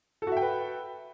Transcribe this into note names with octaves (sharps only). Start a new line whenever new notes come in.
F#4 A4 B4 E5 G5